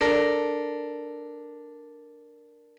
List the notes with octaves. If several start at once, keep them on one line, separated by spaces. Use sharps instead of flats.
D4 A4 A#4